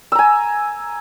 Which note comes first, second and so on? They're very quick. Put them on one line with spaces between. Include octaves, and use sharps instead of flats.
E6 A#5 G#5